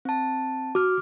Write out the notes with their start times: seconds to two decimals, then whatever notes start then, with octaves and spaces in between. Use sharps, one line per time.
0.05 C4 A5
0.75 F#4 D6 F6